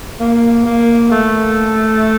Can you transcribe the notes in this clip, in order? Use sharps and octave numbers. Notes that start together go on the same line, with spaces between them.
A#3
A#3
A3